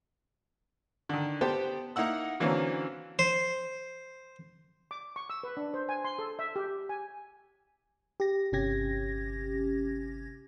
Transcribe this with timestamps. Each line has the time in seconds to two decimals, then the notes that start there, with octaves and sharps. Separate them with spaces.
1.09 D3 D#3
1.41 B3 G4 B4 C5 G5 A5
1.96 A#3 D#4 E4 F#5 E6
2.40 D3 E3 F#3 A#3 C4 C#4
3.19 C5
4.91 D6
5.16 C#6
5.30 E6
5.43 B4
5.57 D4
5.74 C5
5.89 G#5
6.04 C6
6.19 A4
6.39 E5
6.56 G4
6.89 G#5
8.20 G4 A#6
8.52 G1 C3 C#4 G4 G#6 A#6